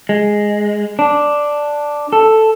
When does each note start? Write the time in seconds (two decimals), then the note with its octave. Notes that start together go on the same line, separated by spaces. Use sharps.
0.09 G#3
0.99 D4
2.13 A4